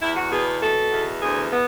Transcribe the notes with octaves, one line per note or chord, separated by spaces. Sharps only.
E2 E4
F#4
B2 G#4
B2 A4
E2
D2 G#4
B3